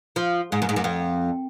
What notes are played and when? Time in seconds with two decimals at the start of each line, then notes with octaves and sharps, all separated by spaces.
0.16 F3
0.52 G#2
0.62 F#2
0.69 G#2
0.76 F#2
0.84 F2